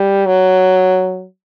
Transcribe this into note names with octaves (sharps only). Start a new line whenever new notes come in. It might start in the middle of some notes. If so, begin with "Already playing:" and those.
Already playing: G3
F#3